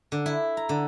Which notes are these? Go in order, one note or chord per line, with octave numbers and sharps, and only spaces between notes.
D3
E4
A#5
D3